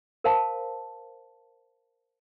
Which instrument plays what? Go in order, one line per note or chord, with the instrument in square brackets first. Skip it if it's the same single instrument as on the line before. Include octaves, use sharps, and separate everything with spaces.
[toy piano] A#4 C5 F5 A5 B5